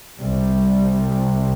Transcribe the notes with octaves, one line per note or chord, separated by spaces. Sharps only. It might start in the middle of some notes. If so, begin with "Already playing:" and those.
C2 C3 G3